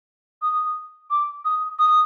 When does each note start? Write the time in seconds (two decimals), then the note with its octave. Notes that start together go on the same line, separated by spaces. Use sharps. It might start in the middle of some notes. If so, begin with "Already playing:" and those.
0.42 D#6
1.10 D6
1.45 D#6
1.79 D#6